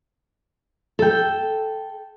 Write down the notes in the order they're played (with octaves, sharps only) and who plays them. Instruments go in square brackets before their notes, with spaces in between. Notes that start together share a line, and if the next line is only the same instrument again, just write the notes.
[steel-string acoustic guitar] A4 G5